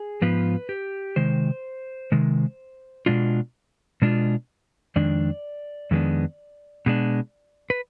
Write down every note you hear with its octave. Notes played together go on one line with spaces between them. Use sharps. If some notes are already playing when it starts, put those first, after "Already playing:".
Already playing: G#4
G#2 F3 B3 F4 B4
G4
C3 D#3 G#3 C5
C3 D#3 G#3
B2 G#3 D4 F4
B2 G#3 D4 F4
F2 D#3 G#3 D4 D5
F2 D#3 G#3 B3 D4
B2 G#3 D4
B4